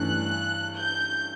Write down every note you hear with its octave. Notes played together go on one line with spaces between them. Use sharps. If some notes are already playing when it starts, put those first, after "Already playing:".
Already playing: G2 E3 A3 C#4 F#6
G6